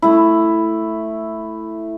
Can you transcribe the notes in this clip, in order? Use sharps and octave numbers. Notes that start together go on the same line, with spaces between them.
A3 E4